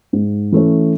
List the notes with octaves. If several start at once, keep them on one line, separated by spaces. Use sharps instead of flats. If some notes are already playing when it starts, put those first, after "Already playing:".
G#2
E3 A3 C#4